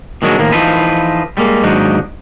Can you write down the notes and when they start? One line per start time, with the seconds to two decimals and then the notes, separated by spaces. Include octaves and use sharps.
0.22 A#2 D#3 F#3 G#3 D4 F#4
0.38 A2 D#3 F3 A#3
0.52 E3 F3 D#4 F4 A4 B4
1.37 G3 G#3 A#3
1.63 D#2 G#2 F#3 G#3 D4 D#4